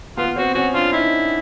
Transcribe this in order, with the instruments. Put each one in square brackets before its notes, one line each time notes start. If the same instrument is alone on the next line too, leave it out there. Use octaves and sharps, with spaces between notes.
[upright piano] B3 [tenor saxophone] F4
[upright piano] C4 [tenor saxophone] F#4
[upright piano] C#4 [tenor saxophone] F#4
[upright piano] D4 [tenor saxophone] F4
[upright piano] D#4 [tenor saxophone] E4